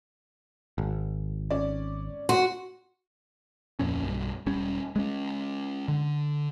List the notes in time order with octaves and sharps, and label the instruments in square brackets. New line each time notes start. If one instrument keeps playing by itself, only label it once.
[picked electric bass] G#1
[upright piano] C#4 D5
[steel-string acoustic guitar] F#4 [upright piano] C6
[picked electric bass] D1 F2 A#2 C#4
B1 G2
E1 G3 C#4
G#3 B3 C#4
D3